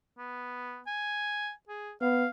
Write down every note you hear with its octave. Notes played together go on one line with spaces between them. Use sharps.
B3
G#5
G#4
B3 F5